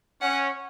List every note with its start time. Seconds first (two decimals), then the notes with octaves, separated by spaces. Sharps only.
0.21 C#4 F#5